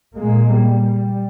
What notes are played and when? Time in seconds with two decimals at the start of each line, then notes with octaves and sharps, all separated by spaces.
0.15 A#2 G#3 A#3
0.53 G3